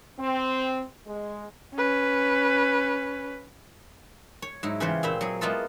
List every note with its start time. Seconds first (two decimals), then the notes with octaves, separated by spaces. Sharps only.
0.19 C4
1.07 G#3
1.75 C#4 B4
4.42 C#5
4.63 G#2 F#3 E4
4.80 C#3 E3 F4 G4 C5 C#5
5.03 A#2 C4 C5 E5 B5
5.21 F#3 G#4
5.41 G#3 A#3 B3 E4 F4 A4